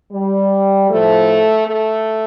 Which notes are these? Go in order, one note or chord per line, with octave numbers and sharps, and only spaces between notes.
G3
A2 F3 A3
A3